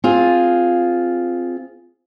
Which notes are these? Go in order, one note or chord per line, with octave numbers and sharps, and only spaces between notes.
C4 F4 G#4